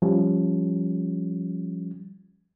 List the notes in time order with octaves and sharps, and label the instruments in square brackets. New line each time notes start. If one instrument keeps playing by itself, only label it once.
[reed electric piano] F3 G3 C#4